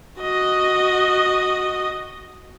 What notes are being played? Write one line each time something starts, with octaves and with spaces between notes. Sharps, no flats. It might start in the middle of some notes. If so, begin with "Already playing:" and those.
F#4 D#5